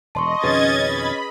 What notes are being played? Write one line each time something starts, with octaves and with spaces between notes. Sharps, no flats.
E1 D#5 A5 C6 C#6
F2 B2 D#3 C#4 G#4 B4 G#6 A6
B5